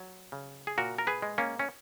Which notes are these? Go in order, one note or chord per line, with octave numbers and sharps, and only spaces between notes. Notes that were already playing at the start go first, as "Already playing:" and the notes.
Already playing: F#3
C#3
G#4
A#2 F#4 A#4
A#4
G#4 B4
G#3
A#3 C#4
C#4